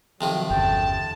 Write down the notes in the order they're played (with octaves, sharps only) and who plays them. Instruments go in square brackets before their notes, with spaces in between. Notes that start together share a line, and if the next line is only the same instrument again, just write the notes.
[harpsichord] F2 C3 D#3 [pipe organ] F#3
[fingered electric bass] G1 E2 C#3 [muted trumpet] G5 [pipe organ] A5